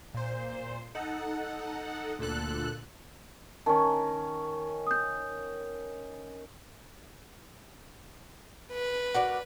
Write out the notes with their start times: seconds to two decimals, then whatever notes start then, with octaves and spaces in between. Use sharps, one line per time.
0.14 A#2 C5
0.95 D#4 A4 F#5
2.19 D2 A#2 D3 A4 F#6
3.66 D#3 C#4 A5
4.87 D#6 G6
8.72 B4
9.14 F#4 A#4 D5